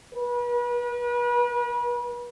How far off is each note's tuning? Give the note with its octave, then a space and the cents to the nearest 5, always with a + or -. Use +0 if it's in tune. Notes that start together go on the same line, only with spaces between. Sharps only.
B4 -35